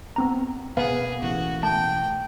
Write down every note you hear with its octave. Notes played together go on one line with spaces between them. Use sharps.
B3 C4 A#5
B2 A#3 B3 G#4 F5
A1 F#4
A3 G5 A5